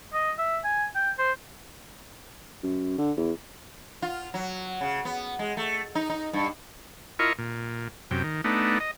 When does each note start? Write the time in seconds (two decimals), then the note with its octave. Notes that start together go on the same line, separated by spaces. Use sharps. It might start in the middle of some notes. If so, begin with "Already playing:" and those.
0.14 D#5
0.38 E5
0.64 G#5
0.95 G5
1.19 C5
2.63 F#2
2.98 D3
3.17 E2
4.02 F4
4.34 F#3
4.81 C#3
5.05 B3
5.39 G#3
5.57 A3
5.95 D#4
6.10 D#4
6.33 G2
7.19 E4 F4 A#4 D#5 C#6
7.38 A#2
8.11 F#2 C3 G5
8.23 D#3
8.44 A3 B3 D4 D#4
8.80 D#5